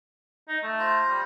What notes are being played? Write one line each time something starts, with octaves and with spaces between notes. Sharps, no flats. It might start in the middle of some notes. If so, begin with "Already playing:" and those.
D#4
A3
F4 C5 A#5
G3